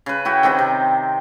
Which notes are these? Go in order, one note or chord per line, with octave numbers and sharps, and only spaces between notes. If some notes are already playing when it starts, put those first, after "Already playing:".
C#3 B4
E4 F#4 G5
D#3 C4 G4 B4
C3